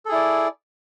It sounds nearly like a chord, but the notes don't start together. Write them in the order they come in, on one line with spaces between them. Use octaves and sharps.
A4 G#4 E4 D5